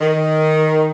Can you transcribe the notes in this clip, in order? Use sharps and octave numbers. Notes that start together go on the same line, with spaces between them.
D#3